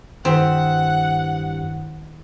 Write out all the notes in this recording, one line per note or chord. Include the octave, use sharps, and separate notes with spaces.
G2 D#3 C4 E4 F#5